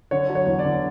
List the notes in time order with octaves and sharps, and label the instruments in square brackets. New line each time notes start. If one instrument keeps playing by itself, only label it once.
[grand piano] D3 C#5
F#3
C#5
E2
D5
D3